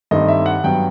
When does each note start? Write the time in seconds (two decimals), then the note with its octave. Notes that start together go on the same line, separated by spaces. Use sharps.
0.11 G2 D#3 A3 C4 D#5
0.28 E5
0.46 F#5
0.64 G2 F#3 B3 G5